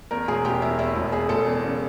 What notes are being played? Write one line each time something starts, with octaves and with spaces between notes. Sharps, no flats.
E2 A#4
E1 G#4
E1 G4
E2 E4
E2 E4
E1
E2 G#4
E1 A4
E2
C#3